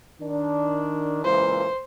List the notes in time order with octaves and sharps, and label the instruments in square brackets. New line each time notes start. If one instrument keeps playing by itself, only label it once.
[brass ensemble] D#3 D4
[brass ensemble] C#2 A#2 E3 [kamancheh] C5